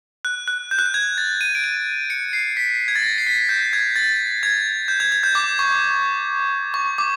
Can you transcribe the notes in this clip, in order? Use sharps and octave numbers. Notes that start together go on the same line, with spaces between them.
F#6
F#6
G6
F#6
G6
G#6
A6
D#7
D7
D#7
C#7
C7
B6
G#6
A6
A#6
C7
B6
G6
G#6
A6
G#6
G6
G#6
G#6
G6
D6
C#6
C#6
D6